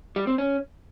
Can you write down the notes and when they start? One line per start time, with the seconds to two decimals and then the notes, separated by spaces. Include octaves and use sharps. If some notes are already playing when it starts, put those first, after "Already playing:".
0.16 G3
0.27 C4
0.38 C#4